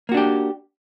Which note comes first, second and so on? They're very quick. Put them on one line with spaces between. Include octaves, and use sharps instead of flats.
A#3 F#4 D4 G4